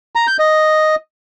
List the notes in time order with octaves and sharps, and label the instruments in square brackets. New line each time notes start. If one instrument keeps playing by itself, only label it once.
[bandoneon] A#5
G6
D#5